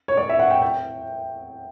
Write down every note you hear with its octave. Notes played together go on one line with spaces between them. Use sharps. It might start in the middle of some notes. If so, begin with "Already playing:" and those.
C#5
D5
E5
F#5
G5
G5